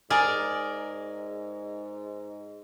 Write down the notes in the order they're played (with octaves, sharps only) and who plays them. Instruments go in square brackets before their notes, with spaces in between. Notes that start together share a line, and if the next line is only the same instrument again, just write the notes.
[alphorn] G#2 [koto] G#4 A#4 D5